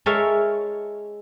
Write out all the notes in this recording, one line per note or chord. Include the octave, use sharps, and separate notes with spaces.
G#3 A4 A#4 C#5 E5 F5